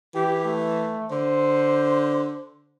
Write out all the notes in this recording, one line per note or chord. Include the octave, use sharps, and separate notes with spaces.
E3 G4
A3
D3 C5